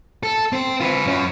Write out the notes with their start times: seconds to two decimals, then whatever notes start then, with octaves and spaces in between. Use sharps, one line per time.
0.23 A4
0.53 C4 C5
0.80 F4 B4
1.05 F#2 C#4